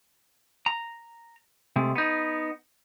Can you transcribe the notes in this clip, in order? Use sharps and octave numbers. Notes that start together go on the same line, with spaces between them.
A#5
C3 G#3 A3
B3 D#4